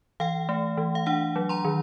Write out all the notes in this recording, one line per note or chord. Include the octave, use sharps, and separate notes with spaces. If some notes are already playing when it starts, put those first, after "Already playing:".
E3 F5 G5
A3
E3
F5
D4 F#5
F#3
A#5 C6
D#3